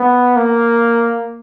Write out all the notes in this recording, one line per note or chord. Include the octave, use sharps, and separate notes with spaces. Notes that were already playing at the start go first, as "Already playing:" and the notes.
Already playing: B3
A#3